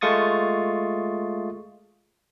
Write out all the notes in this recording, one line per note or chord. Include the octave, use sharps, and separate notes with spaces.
G#3 A3 F4 C#6 D#6 A6